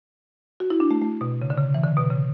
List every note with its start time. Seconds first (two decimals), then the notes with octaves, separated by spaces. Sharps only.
0.60 F#4
0.70 E4
0.80 D4
0.91 A3
1.01 A3
1.21 B2
1.42 C#3
1.50 D3
1.58 C#3
1.74 E3
1.83 D3
1.97 B2
2.11 C#3